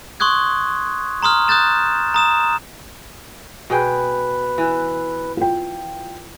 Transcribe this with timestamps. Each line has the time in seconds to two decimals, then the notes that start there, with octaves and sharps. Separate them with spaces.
0.20 C6 C#6 D#6 F#6 G#6
1.22 A#5 C6 D#6 F6
1.48 D#6 F#6 G6 A6 E7
2.14 A#5 D#6 E7
3.70 B2 G#4 B4 G5
4.58 E3
5.37 F4 G5